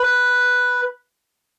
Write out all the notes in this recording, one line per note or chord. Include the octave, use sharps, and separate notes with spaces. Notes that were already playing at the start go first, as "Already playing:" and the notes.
Already playing: B4